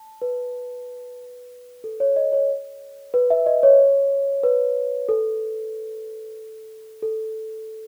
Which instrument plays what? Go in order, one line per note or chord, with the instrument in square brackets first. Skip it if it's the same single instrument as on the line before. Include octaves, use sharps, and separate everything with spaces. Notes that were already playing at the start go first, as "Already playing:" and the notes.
Already playing: [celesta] A5
B4
A4
C#5
D#5
C#5
B4
E5
D#5
C#5
B4
A4
A4